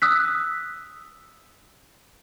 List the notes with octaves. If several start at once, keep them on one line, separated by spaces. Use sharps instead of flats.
D#6 E6 F#6 B6